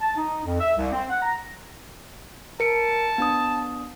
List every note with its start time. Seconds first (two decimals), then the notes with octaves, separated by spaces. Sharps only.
0.01 A5
0.16 D#4
0.45 F2
0.60 E5
0.77 C2
0.92 C4
1.10 F#5
1.22 A#5
2.60 A#4 A5 C#7 D7
3.18 B3 D4 D#6